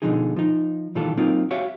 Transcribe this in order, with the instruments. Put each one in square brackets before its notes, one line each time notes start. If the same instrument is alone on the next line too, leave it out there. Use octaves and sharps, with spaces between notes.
[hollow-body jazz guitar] B2 D3 E3 F3 D#4 G#4
F3 D#4
A#2 D#3 E3 G3 F4 A4
F#3 A#3 C4 D#4 F4
F#4 G4 C#5 E5 F5